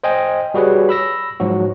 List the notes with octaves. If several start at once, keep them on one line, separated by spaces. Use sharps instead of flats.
C5 D#5 G5 G#5
G3 F#4 G#4 B4 C#5
B5 E6 A#6
G#2 F3 F#3 F#4